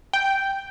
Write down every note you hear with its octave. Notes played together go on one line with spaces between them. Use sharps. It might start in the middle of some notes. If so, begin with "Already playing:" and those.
G5